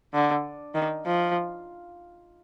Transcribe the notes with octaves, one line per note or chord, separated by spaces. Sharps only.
D3
D#3
F3